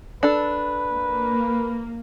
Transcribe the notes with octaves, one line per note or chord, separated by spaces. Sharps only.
D4 A4 B4
A#3